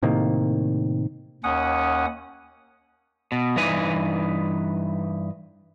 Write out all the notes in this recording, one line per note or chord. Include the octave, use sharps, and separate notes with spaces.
A2 C3 D#3 A#3
D#2 C#4 F#5 D#6
B2
G2 E3 D#4 B4 G#5